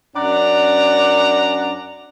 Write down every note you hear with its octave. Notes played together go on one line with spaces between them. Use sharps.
F#2 C#4 D4 D5 F#5 A#5